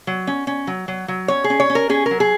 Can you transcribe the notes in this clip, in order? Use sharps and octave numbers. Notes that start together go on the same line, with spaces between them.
F#3
C#4
C#4
F#3
F#3
F#3
C#4 C#5
G#4
C#4
C#5
C#4
A#4
C#4 G#4
A#4
F#3
G#4